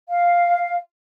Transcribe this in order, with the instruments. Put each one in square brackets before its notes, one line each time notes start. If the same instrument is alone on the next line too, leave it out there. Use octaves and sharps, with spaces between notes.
[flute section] F5